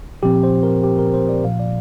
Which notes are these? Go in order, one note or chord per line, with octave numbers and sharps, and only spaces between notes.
A#2 F3 C4 G4
C5
A#4
G4
A#4
C5
D5
A#2 F3 A#3 F5
D5